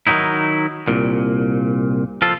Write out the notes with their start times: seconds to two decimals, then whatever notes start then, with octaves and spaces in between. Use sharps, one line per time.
0.07 D#3 E3 F#3 D#4 E4
0.88 C2 A#2
2.22 F3 F4 A4